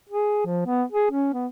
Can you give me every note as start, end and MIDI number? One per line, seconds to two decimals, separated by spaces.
0.09 0.43 68
0.46 0.66 53
0.66 0.83 59
0.92 1.10 68
1.11 1.33 61
1.33 1.47 59